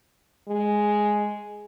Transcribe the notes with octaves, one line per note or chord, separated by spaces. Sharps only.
G#3